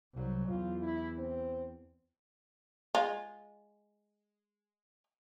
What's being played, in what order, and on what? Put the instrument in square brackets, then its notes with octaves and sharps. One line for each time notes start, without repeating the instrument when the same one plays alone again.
[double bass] C2 F#3
[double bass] E2 [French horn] F4
[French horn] E4
C4
[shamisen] G#3 F4